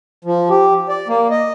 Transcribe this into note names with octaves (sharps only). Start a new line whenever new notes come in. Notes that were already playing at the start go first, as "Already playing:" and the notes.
F3
G4
D5
A#3
D#5